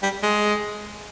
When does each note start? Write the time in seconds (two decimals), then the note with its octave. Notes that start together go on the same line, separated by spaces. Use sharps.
0.03 G3
0.23 G#3